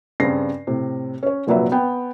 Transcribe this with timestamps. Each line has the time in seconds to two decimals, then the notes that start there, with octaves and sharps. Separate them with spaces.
0.20 G2 C#3 C4 A#6 C7
0.67 A2 C3
1.23 C#4 C#5
1.47 F1 A#1 A#2 F#3 B4 E5
1.72 B3 G5